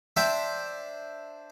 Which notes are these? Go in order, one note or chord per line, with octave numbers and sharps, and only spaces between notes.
D4 C5 E5 G5